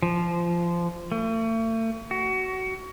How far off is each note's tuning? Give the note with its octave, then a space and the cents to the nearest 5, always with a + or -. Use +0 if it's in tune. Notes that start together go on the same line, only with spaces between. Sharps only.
F3 -20
A3 +40
F#4 +25